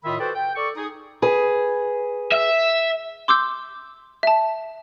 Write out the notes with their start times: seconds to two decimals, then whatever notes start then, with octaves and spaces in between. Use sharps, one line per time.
0.05 A2 D#3 F4 D#5 E5 B5
0.20 F#4 A4 B4 C5 D5 G5
0.35 G5
0.56 A4 D5 C#6
0.76 D#4 G#4 D#6
1.22 G#4 B4
2.32 E5
3.28 C6 D6 E6 G6
4.23 E5 A5